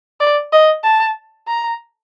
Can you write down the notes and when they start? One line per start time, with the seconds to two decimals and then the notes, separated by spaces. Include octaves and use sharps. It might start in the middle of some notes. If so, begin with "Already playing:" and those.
0.20 D5
0.52 D#5
0.84 A5
1.48 A#5